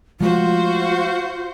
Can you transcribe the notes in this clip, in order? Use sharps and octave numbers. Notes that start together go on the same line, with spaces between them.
F3 G#3 A3 F4 F#4 C5 F#5